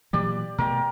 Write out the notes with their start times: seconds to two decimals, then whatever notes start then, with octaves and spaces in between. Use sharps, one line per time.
0.13 A#2 E3 F#3 G4 D5
0.58 B2 A3 A#4 G5